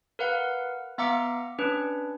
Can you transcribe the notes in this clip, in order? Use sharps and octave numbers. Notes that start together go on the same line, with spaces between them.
A#4 B4 F5 F#5
B3 E5 F5 A#5 D6 C#7
C#4 D4 B4